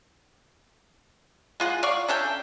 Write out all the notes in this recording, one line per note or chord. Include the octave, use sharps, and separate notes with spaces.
G#3 F4 F#5
D5 F5 C#6
C#4 D4 A4 G5